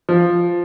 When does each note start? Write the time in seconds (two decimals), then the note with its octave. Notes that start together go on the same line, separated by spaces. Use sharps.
0.09 F3